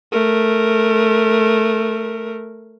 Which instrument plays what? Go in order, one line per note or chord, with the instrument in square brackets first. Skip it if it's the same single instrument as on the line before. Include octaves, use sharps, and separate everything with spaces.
[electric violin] A3 A#4